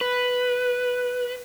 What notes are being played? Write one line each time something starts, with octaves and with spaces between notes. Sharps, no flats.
B4